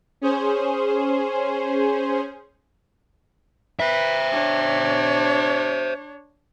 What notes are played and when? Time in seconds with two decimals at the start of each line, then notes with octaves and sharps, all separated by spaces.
0.21 C#4 G#4 C5
3.80 B4 C5 E5
4.31 D4 C#5